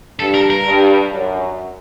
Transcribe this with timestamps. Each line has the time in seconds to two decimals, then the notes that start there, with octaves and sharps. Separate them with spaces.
0.19 G2 A4
0.34 A#4
0.50 A#4
0.65 G2
1.12 F#2